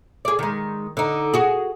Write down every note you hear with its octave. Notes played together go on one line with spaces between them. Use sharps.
G#4 D5
D#3 G#3
D3 D#4
F#4 G#4